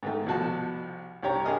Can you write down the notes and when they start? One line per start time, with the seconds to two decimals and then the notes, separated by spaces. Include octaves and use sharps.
0.03 G#2 D#3 A3
0.26 C2 B2 F3 F#4 A5
1.23 C2 G2 G4 C#5 A#5
1.45 G2 G#4 A#4 D#5 F6